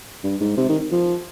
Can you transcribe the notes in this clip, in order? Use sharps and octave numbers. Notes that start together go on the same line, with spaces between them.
G2
G#2
C3
D#3
F3